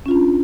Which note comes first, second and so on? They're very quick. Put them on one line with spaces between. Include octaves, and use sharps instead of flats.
C#4 F4 D4